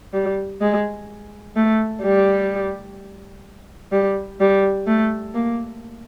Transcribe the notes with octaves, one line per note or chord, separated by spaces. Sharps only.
G3
G#3
A3
G3
G3
G3
A3
A#3